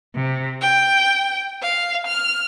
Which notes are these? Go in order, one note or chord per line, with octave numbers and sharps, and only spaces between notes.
C3
G5
F5
F6